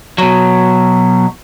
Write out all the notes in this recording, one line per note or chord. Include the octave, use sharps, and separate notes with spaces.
B2 F#3